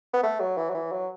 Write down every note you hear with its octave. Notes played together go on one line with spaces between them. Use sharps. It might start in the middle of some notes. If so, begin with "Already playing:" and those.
B3
A3
F#3
E3
F#3
E3
F#3